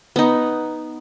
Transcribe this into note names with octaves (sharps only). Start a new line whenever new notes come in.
B3 D#4